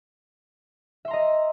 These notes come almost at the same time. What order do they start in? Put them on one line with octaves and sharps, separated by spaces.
E5 C6 A#5 D#5